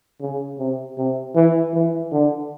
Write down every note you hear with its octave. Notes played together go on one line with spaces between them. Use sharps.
C#3
C3
C3
E3
E3
D3